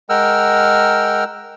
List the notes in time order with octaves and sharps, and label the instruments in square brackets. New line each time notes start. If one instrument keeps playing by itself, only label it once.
[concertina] G#3 A#4 F#5 G5 E6 F6